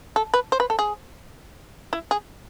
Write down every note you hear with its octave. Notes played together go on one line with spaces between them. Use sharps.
A4
B4
C5
B4
A4
G#4
E4
G#4